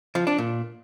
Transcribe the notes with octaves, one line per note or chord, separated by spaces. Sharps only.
F3
D4
A#2